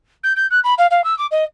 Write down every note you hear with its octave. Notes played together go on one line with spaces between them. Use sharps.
G6
G6
F#6
B5
F5
F5
E6
D6
D#5